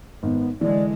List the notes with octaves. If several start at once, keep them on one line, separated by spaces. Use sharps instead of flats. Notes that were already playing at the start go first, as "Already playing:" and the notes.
G#1 B3
D3 E3 G#3 D5